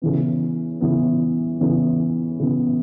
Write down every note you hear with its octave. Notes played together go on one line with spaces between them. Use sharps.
C#3 E3 B3
C#3 E3 B3
C#3 E3 B3
C#3 E3 B3